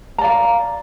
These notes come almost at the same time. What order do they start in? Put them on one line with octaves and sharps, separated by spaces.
A#5 D5 F5